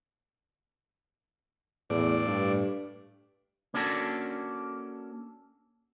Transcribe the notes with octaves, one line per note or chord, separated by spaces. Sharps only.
E2 A2 D5
G2
A#3 C#4 D4 F#4 A4